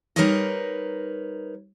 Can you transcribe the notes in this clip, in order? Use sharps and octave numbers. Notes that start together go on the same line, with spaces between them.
G3 D#4 A#4 B4 C#5 D#5